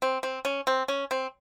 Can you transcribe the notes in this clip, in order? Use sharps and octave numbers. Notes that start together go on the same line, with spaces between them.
C4
C4
C#4
C4
C#4
C4